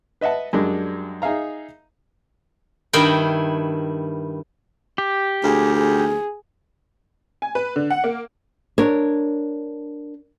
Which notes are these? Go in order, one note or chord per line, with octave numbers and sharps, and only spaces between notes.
B4 D#5 E5 F#5 A5
F#2 G3 G#3 D4
D#4 G#4 E5 F5 A#5
G2 D#3 E4 A#4 G5
G4
D2 G#4
G#4
G#5
B4
D3
F#5
A#3
D4 A#4 C#5